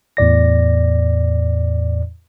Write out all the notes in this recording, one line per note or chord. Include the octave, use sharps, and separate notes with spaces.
E2 A2 D5 A#6